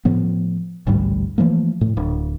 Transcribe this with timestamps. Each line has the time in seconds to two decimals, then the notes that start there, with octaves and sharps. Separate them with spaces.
0.05 A2 F3 B3
0.87 A1 D2 G#2 G3
1.38 E3 F3 A3 A#3
1.81 A2
1.97 D1